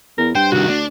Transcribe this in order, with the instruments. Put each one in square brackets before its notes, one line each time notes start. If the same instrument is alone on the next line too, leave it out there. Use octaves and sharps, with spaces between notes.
[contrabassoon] E2 [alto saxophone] A#4
[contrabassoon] G2 [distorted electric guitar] C5 [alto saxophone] G5
[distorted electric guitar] C2 D#3 [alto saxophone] F#4
[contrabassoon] D2 [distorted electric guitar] D4